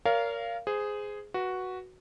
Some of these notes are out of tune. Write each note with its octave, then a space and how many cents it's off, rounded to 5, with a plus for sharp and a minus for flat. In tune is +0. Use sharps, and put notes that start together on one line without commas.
A#4 +0 C#5 +40 F5 -15
G#4 +0 C5 -25
F#4 +0 B4 -20